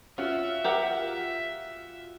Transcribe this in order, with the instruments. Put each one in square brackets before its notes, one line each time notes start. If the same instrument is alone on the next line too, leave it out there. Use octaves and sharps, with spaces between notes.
[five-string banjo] C#4 [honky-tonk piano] F4 F#4 [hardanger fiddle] E5
[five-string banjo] G4 A#4 F#5